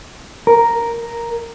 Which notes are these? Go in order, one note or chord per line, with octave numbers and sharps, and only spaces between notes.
A#4